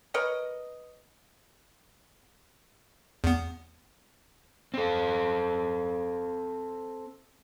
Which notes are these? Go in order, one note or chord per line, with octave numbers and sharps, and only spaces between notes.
A#4 B4 C#5 D#5
E2 B3
C4 A4